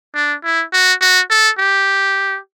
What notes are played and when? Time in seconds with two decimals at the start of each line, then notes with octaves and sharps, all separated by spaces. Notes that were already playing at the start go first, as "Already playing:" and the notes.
0.15 D4
0.44 E4
0.73 F#4
1.01 F#4
1.30 A4
1.59 G4